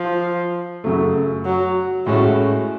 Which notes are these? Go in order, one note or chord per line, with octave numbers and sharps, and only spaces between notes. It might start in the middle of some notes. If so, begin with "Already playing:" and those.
Already playing: F3
F#2 C#3 F#3 A3
F#3
A2 G#3 A3 C#4 F#4